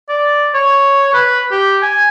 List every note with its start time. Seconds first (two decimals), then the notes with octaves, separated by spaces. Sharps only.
0.09 D5
0.54 C#5
1.13 B4
1.52 G4
1.82 G#5